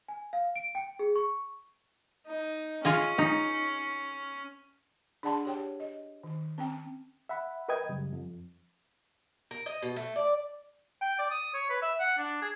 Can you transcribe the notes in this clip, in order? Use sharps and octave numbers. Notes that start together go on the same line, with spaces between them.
G#5
F5
D7
G5
G#4
C#6
D#4
C#4 F4 G#4 D#5
D#4
D4 G#4 D5 F#5 A5 C6
G4 C#5 G5
D#5
D#3
C4 C#4 G5
E5 F#5 B5
A#4 B4 D#5 G5 D#6 G#6
F#2 C#3 G3
F2
A#4
D#5
B2
A3
D5
G5
D5
D#6
C#5
B4
E5
F#5
D4
G#4